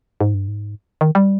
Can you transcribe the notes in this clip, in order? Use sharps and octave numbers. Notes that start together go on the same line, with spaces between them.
G#2
G2
G#2
D#3
G3